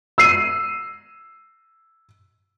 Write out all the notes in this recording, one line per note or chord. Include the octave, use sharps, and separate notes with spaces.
E6 C7 D#7